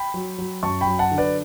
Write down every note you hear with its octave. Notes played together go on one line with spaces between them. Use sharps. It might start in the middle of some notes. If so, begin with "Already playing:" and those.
Already playing: G5 B5
F#3
F#3
F#2 A5 C#6
G5 B5
F#3
F#5 A5
D3
B4 D5